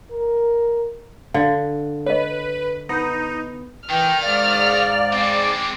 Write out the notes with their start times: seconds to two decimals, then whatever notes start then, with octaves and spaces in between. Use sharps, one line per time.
0.11 A#4
1.34 D3 F5
2.06 B4 C#5 D#5
2.89 B3 D#4
3.89 D#3 E3 G5 F6
4.22 G#2 D5 F5
5.12 G#3 C4 D6